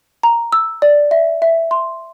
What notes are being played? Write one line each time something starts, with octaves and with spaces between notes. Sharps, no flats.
A#5
E6
D5
E5
E5
C6